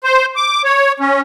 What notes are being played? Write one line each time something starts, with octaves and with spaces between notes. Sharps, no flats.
C5
D6
C#5
C#4